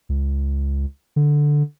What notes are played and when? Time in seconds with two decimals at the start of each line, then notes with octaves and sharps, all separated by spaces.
0.09 C#2
1.16 D3